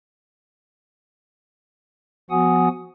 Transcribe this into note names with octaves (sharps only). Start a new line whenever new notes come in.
F3 B3 F#4 F#5 G#5 D#6